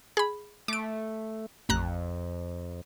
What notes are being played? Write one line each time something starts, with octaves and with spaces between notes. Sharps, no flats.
G#4 B5
A3 D6 D7
A1 F2 A#5 F#6